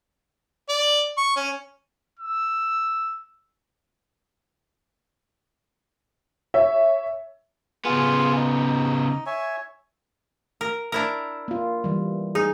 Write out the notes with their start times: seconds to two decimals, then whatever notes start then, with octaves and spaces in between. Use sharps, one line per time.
0.69 D5
1.17 C#6
1.36 C#4
2.20 E6
6.54 C#5 E5
7.85 C#3 B3 F4 G#4
8.36 D#4
9.26 C#5 E5 G#5
10.61 A#4
10.92 D4 E4 A#4
11.48 A#3 F4
11.84 E3 G3
12.35 D#4 G#4